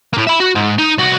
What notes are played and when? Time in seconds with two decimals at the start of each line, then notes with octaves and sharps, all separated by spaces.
0.13 A2 A#3
0.27 E5 B5
0.40 F#4
0.55 G#2
0.78 D#4
0.98 C2 F#4